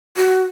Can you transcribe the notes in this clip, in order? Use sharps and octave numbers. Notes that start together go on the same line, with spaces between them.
F#4